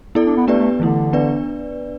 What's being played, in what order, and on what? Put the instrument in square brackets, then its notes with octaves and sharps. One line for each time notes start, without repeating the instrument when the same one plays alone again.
[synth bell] B3 E4 A4 D5
[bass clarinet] D4
B3
[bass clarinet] A3 [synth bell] B3 D4 G4 B4 D5
[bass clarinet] A3
[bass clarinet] D3 [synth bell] E3 A3 E4
[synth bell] B3 D4 B4 D5